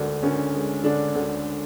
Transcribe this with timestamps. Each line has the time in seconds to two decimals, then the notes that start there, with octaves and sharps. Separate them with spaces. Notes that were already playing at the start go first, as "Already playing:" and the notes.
Already playing: D2 D3 G#3 D4
0.22 D2 C#4
0.54 G#3
0.84 D3 D4
1.15 D2